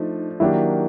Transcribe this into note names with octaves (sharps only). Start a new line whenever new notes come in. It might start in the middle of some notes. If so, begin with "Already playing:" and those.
Already playing: F3 A3 D4 D#4
D#3 F#3 A#3 D4 E4 G4